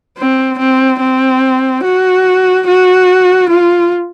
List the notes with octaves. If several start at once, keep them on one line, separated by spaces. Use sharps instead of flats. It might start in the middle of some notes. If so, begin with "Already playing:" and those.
C4
C4
C4
F#4
F#4
F4